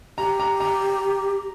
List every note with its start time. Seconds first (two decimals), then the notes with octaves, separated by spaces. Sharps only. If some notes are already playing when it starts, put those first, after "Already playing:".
0.18 G4 A#5
0.40 A#5
0.60 A#5